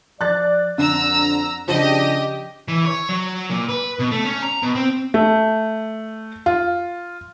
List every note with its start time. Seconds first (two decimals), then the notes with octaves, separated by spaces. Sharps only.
0.21 F3 D5 F#6 A6
0.78 F2 D3 A#5 E6
1.68 C#3 F3 D4 G4 D#5 D#7
2.68 E3
2.85 C#5
3.09 F#3
3.50 A#2
3.69 B4
4.00 B2
4.12 A3
4.25 C#4
4.42 A#5
4.62 B2
4.75 C4
5.14 A3
6.46 F4